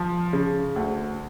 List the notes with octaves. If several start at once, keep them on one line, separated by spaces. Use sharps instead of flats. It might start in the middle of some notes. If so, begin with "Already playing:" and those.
Already playing: F3
C#3
D2